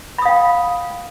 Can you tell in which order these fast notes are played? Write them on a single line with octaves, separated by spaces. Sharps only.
B5 D#6 F5 G5